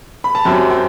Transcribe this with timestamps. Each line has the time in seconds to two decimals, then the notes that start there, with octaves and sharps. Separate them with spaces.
0.24 B5
0.35 A5
0.45 F#2 F#3 C4 G4 G5
0.71 G5